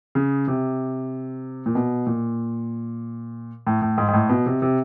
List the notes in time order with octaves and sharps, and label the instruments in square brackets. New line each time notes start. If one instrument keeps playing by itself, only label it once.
[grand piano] C#3
C3
A#2
B2
A#2
A2
A2
G#2
G#2
A2
B2
C3
C3